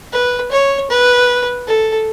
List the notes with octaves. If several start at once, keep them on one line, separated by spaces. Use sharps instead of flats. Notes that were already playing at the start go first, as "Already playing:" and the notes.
B4
C#5
B4
A4